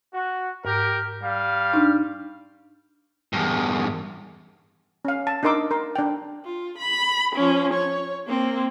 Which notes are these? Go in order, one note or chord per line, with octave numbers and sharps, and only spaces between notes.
F#4
G#2 G4 A#4
G3 F5
D4 D#4
E2 G2
C#4 F5
A5
D4 D#4 A#4 C6 D6 E6
A#4 C6
D4 G5
F4
B5
F3 C#4
C#5
A#3 C4